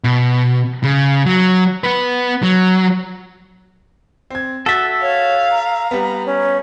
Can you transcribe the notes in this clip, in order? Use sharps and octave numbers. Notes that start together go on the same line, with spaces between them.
B2
C#3
F#3
B3 B4
F#3
C4 G#6
F#4 A4 E5 A6
C#5 F5
A#5
G3 B3
C#4